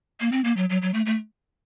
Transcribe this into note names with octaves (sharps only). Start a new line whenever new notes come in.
A#3
C4
A#3
F#3
F#3
F#3
A3
A3